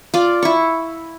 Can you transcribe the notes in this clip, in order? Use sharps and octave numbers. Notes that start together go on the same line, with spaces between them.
F4 D5
E4 C#6